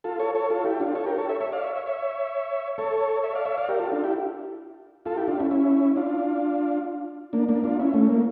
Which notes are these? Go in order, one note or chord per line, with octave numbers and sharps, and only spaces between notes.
F4 A4
A4 C#5
A4 C#5
F4 A4
E4 G4
D4 F4
A4 C#5
G4 A#4
A4 C#5
C#5 E5
C#5 E5
D5 F5
C#5 E5
C#5 E5
C#5 E5
A4 C#5
C#5 E5
D5 F5
C#5 E5
D5 F5
G4 A#4
F4 A4
D4 F4
E4 G4
F4 A4
E4 G4
D4 F4
C#4 E4
C#4 E4
D4 F4
A#3 D4
A#3 D4
D4 F4
C#4 E4
A3 C#4
A#3